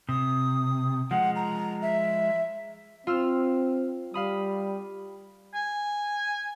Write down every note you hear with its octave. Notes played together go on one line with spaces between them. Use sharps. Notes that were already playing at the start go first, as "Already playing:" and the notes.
C3 D#6
F3 G#3 F#5
A#5
E5
C4 F4 E6 F6
G3 F5 B5 D#6
G#5